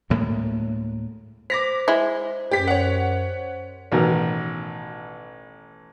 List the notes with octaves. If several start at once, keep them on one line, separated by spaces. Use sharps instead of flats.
D2 A2 G#3 A#3
C5 D6 A#6 B6
G#3 E4
F#2 G4 B6
C5 C#5 F#5
A1 B2 D#3 F#3 A#4